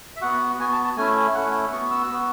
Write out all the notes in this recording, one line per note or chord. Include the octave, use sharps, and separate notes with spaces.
E5
B3 F#4 F#5
B3 F#4 G#5
A5
A5
A3 C#4 E4 G#5
A3 C#4 E4 F#5
B3 F#4 C#6
E6
B3 F#4